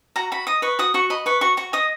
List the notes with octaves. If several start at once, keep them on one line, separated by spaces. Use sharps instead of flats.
F#4 A#5
F#4 B5
D#5 D#6
B4 C#6
F#4 D#6
F#4 C#6
D#5 B5
B4 C#6
F#4 C#6
F#4 C#6
D#5 D#6